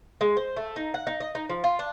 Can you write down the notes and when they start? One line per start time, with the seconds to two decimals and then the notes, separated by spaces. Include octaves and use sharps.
0.21 G#3
0.37 C5
0.57 A3
0.76 D#4
0.94 F#5
1.07 D#4
1.20 D#5
1.35 D#4
1.50 F3
1.64 F4
1.79 D4